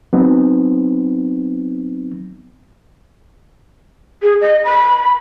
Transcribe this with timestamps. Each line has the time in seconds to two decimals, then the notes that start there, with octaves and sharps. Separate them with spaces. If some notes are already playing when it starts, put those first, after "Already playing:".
0.13 F#3 B3 C4 D#4
4.23 G#4
4.41 D#5
4.65 B5